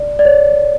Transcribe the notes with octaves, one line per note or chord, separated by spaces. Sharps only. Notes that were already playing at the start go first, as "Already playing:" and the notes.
Already playing: D5
D5
C#5